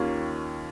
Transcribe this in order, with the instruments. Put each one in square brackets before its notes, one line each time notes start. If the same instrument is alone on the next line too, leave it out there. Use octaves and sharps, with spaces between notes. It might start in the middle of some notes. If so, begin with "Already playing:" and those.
Already playing: [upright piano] D#2 D#3 A#3 C#4 F4